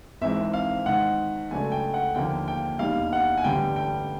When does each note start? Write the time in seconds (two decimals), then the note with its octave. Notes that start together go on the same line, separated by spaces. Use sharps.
0.21 G#1 G#2 E3 G#3 C4 E5
0.53 F5
0.86 G#2 D#3 G#3 F#5
1.51 C#2 C#3 F#3 A3 D4 G#5
1.72 G5
1.94 F#5
2.15 D#2 D3 F3 A#3 G5
2.48 G5
2.79 E1 D#2 D#3 G3 F5
3.13 F#5
3.38 G#5
3.44 A1 G2 D3 G3 G5
3.76 G5